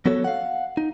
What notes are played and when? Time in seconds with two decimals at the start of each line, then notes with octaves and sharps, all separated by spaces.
0.06 F#3 B3 F#4 A4 C#5
0.24 F5 F#5
0.77 D#4